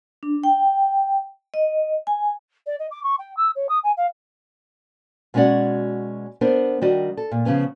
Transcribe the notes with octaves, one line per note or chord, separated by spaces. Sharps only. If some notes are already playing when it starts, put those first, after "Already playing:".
D4
G5
D#5
G#5
D5
D#5
D6
C#6
G5
E6
C#5
D#6
G#5
F5
B2 G#3 C#4 F#4 D5 F#5
B3 D4 A#4 C5
D#3 G3 D4 F#4 D#5
A4
A#2
C#3 F3 B3 C#4